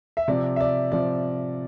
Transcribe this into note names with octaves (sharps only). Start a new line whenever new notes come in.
E5
C3 F3 D5
E5
D5
C3 F3 D5